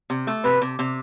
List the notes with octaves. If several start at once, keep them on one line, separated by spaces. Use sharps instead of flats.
C3
A3
C3 B4
C3
C3